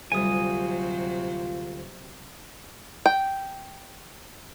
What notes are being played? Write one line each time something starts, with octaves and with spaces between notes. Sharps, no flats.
D2 C3 F#3 G3 F4 C5 G#5 D#6
G5